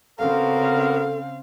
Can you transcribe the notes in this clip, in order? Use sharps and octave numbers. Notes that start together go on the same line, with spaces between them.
C#3 B3 C4 F#4 A4 A#4 F5